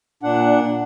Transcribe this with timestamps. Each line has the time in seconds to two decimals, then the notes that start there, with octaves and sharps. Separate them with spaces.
0.23 A#2 D4 F#5